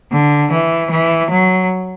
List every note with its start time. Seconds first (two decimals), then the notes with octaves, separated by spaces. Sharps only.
0.11 D3
0.51 E3
0.90 E3
1.30 F#3